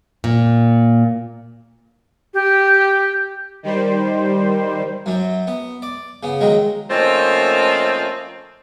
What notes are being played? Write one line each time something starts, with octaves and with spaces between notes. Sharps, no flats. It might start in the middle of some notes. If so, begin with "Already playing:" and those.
A#2
G4
D#3 G3 C5
F#2 F#3
B3
D5
C#3 B3
D#3 F#3 G#3
F3 A3 A#3 C4 C#4 D#4